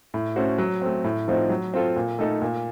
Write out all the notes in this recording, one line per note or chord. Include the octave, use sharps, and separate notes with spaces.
A2
A3 C#4 F#4 C5
F#3
A3 C4
A2
F3 A3 C4 D#4
F#3
C4 F4 A4
A#2
A3 D#4 A4
A#2